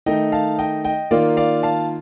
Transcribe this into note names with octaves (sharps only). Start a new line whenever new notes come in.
D#3 A3 D#4 D#5 G5
F5 A5
D#5 G5
D#5 G5
D#3 A#3 F4 D5 F5
D5 F5
F5 A5